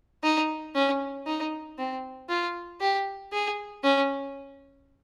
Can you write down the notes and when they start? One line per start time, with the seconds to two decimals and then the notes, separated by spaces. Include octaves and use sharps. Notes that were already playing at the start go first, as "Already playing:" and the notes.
0.23 D#4
0.75 C#4
1.26 D#4
1.78 C4
2.29 F4
2.81 G4
3.33 G#4
3.83 C#4